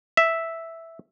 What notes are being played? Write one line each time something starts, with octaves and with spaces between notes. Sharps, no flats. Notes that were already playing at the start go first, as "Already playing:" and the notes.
E5